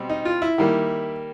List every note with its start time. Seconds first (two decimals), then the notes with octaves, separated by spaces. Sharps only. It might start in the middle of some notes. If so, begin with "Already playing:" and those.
Already playing: B2 G3 C4
0.09 D#4
0.25 F4
0.42 E4
0.58 D#3 G3 A#3